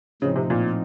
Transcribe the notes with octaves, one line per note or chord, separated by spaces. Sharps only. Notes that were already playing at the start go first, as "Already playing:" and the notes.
A2 C#3 F3 C4 D#4
C3
A#2